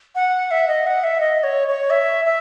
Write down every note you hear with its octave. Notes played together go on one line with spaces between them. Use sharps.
F#5
E5
D#5
F#5
E5
D#5
C#5
C#5
E5
E5